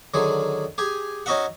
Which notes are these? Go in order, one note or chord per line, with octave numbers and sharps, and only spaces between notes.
D3 D#3 F#3 G#4
G4 G#4 G#5
C#4 D#4 F#4 D#5 E5 F#5